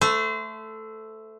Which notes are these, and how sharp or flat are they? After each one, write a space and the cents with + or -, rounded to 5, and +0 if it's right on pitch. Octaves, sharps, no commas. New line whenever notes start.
A3 +0 C5 -30